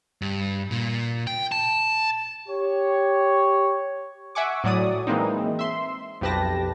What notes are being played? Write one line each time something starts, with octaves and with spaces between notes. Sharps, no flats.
G2
A#2
G5
A5
G4 C#5
E5 F#5 G#5 C#6 D6
A2 F#3 D5 D#6
E3 G#3 A#3 C4 D#4
E5 C6
B1 F2 G4 B4 A5 A#6